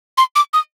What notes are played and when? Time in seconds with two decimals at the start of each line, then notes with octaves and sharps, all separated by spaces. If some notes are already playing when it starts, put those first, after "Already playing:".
0.17 C6
0.36 D6
0.53 D#6